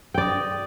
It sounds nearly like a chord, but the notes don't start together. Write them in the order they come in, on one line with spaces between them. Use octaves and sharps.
G5 D5 D#5